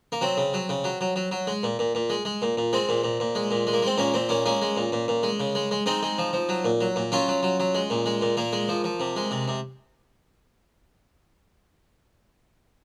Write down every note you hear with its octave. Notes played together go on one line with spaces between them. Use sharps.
A#3
F#3 C4
C#3
F#3
C#3
F#3
F#3
F#3
F#3
G#3
A#2
A#2
A#2
G#3
G#3
A#2
A#2
G#3 C4
A#2
A#2
A#2
G#3
A#2
G#3
A#3
G#3 C4
A#2 A#3 C#4
A#2 C4
A#2 A#3 C#4
G#3 A#3 C#4
G#3
A#2
A#2
A#2
G#3
C#3
G#3
G#3
G#3 C4 D#4
G#3
F3
F3
F#3
A#2
F#3
A#2
F#3 C#4 F4
F#3
F#3
F#3
G#3
A#2
G#3
A#2
A#2 A#3
G#3
F3
F3
C3
G#3
C3
C3